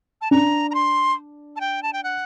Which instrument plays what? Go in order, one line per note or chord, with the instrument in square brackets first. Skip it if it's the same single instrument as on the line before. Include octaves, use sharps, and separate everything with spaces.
[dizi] A5
[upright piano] D4 [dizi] A#5
[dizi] A#5
C6
A5
G5
A5
G5
F#5